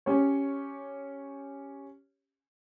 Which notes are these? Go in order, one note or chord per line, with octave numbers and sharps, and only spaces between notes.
C#4 G4 C#5